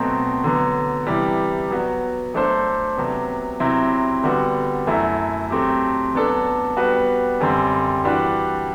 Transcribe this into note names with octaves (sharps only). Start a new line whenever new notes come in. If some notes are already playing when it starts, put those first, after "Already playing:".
Already playing: B2 F#3 A3 C4
D3 F#3 B3
C3 E3 G3
F#3 B3 F#4
F#3 A3 D4 A4 C5
C3 F#3 B3
C3 F#3 C4 E4
D3 G3 B3 F#4
F#2 F#3 A3 E4
F#3 A3 C4 G4
F#3 B3 D4 A4
G3 B3 F#4 B4
F#2 D3 G3 C4
E3 G3 D4 F#4 B4